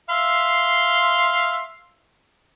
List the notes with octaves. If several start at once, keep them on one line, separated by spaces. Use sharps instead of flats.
E5 F5 C6